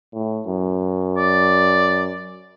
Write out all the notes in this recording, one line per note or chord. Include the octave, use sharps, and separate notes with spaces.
A2
F#2
D5